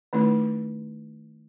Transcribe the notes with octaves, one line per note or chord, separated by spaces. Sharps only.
D#3 A3 C#4 D#4 E4